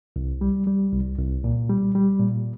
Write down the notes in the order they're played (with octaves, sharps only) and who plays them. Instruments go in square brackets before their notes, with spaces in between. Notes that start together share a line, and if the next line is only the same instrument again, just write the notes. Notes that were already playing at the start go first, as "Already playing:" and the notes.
[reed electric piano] C2
G3
G3
C2
C2
A#2
G3
G3
A#2